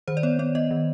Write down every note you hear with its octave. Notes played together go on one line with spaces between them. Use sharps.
D#3 C5
D5
B3 C#5
B3 D5
B3 D#5
D#3